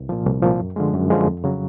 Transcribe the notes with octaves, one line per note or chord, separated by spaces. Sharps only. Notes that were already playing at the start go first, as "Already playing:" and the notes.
Already playing: C2
A#2 F3
C2
A#2 F3
F#2
D3 F3 G#3
F#2
D3 F3 G#3
F2
C#3 F#3